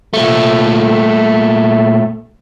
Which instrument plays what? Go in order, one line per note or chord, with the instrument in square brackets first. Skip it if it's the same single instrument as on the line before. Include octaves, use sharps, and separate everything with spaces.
[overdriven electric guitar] A#2 A3